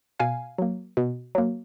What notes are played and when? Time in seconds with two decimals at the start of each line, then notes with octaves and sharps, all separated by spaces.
0.20 B2 F5 G#5
0.58 F#3 A#3
0.97 B2
1.35 F#3 A#3